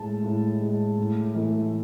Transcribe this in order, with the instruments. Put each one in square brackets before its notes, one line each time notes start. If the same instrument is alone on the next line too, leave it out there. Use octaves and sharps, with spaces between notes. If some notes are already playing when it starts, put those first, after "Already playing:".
Already playing: [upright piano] A2 G#3 A5
A2
G#3
A2
E3 A3